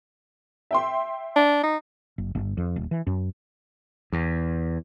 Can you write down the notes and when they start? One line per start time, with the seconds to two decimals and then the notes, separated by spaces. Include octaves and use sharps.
0.71 E5 G5 C6
1.36 D4
1.63 D#4
2.18 F#1
2.35 G1
2.57 F2
2.76 D#1
2.91 E3
3.07 F#2
4.12 E2